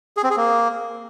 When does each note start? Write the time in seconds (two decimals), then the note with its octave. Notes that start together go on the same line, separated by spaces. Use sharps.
0.17 G#4
0.24 C4
0.30 G#4
0.37 A#3